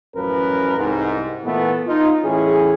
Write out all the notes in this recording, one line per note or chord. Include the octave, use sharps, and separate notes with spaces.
A1 F#2 F3 C#4 A#4 B4
C2 G#2
A#2 E3 A3 B3
D#4 F4
A2 E3 C#4 G#4